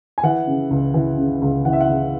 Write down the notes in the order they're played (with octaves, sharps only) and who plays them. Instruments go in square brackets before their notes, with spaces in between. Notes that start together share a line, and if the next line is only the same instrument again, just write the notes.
[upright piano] G#5
E3 F#5
C#3
C#2
E3
C#3
C#2
E3 F#5
E5
F#5
C#3